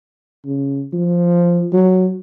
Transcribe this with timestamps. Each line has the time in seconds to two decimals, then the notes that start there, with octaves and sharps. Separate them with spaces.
0.46 C#3
0.93 F3
1.73 F#3